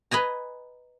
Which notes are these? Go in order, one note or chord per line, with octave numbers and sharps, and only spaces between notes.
B4 D#5 G#5 A#5